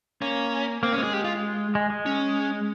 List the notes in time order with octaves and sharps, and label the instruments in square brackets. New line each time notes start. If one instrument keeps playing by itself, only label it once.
[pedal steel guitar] A#3 [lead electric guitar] C#4
[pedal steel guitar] A#3 [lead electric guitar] C4
[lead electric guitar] C#4
[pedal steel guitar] G#3
[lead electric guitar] G#4
G4
F4
[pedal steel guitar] G#3
G#3
[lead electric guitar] C#4